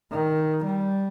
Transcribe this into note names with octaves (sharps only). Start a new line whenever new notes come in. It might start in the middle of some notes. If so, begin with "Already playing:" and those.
D#3
G3